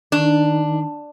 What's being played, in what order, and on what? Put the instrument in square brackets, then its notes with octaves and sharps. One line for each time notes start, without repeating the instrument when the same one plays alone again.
[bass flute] D#3 [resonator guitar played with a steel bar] D4